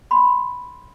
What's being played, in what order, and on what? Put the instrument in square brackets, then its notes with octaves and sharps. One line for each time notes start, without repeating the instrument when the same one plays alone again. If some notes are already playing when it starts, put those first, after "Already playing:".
[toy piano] B5 C6